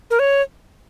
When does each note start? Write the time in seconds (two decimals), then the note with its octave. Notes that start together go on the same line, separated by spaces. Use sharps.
0.10 A#4
0.19 C#5